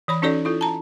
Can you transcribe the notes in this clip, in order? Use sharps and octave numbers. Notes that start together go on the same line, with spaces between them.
E3 C#5 B5
C#4 D#4 F#4 A4 C#5 D5
E4 F4 A4
A5 A#5